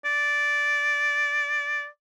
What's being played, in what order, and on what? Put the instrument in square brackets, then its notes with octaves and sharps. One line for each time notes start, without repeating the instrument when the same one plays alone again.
[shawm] D5